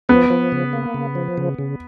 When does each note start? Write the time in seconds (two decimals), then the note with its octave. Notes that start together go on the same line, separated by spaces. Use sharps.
0.09 F3 B3
0.30 F3
0.52 C#3
0.73 A#3
0.94 C#3
1.15 F3
1.38 C#3
1.58 C#3